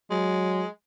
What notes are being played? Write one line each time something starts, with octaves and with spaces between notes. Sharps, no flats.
F#3 G#3